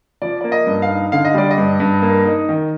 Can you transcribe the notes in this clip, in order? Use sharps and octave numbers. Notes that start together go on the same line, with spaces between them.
F3 D5
A#3 D5
D#5
G2
F5
D#4
D3 F5
D#5
G3 D5
D#5
G2
G2
A#3
D#4
D#3